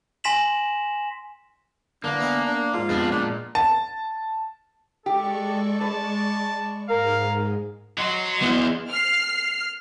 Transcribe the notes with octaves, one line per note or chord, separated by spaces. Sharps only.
G#5 C6 A#6 B6 E7 F#7
D3 E3 A#3 D4
B3 E5 G#5
D4
G#2 F4
F2 G#3 B3 D4
A#2 D4
A5
G#3 G4 A4 D5 C#6
B4 A5
G#2 G#3 A#4 F5
F#3 F#4 D#5 C6
B3 E4
F6 C7